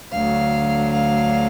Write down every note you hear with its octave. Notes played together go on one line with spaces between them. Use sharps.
D2 D3 F#3 F5
F5